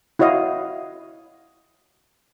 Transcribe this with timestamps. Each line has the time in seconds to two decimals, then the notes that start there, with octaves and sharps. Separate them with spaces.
0.19 E4 F#4 C#5 D#5 F5